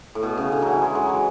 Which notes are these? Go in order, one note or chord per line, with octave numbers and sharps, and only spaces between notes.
A2
B2
C#3
D3
E3 F#3
G#3
F#3
E3